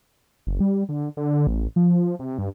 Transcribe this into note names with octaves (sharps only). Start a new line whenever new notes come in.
F#1
G3
D3
D3
A1
F3
C3
G2